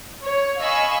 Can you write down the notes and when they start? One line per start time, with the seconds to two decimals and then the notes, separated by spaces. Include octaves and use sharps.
0.24 C#5
0.60 D#5 F5 G#5 B5 C#6 E6